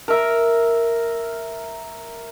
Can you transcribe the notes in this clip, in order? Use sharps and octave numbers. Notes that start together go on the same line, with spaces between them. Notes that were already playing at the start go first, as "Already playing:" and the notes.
A#4 E5